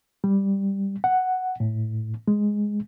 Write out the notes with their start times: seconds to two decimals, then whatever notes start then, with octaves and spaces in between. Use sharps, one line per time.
0.24 G3
1.04 F#5
1.60 A2
2.28 G#3